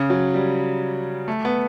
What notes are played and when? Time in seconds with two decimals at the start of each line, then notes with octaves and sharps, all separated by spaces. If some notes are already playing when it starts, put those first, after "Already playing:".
Already playing: C#3
0.10 F#3
0.34 G3
1.28 A3
1.45 B3